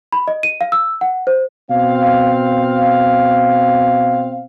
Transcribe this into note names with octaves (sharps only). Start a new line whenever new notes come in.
B5
D#5
D#7
F5
E6
F#5
C5
B2 C4 F5